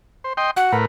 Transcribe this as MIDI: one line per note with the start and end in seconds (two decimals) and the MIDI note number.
0.24 0.33 72
0.37 0.51 75
0.37 0.51 79
0.37 0.51 84
0.57 0.72 66
0.57 0.75 78
0.72 0.85 45
0.72 0.85 70
0.72 0.85 71